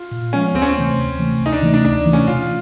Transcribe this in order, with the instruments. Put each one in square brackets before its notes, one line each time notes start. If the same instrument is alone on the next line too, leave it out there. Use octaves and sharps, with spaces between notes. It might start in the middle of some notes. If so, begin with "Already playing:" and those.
Already playing: [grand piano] F4
[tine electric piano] A#2
[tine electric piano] F3 G#3 B3 [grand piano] C#4
[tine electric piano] D2 [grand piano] C4
[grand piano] C#4
C4
[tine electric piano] C3 E3 A3
D2
C3 E3 A3
D2
[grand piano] D#4
D4
[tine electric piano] C3 E3 A3
[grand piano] D4
[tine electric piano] D2 [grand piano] D4
[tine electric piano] C3 E3 A3
[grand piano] C#4
[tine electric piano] B2 [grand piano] F4